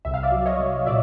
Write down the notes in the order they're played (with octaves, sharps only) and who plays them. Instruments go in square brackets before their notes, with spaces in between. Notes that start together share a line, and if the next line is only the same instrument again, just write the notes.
[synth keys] C2 E5
F5
D5 E5
F#3
C#5 D#5
C2
A#2 D5 E5